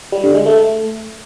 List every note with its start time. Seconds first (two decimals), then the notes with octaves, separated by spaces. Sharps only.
0.12 G3
0.24 D3
0.35 G#3
0.46 A3